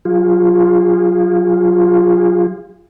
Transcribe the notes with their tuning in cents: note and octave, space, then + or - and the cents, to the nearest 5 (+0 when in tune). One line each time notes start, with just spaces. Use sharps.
F#3 +0 F4 +5 G#4 -30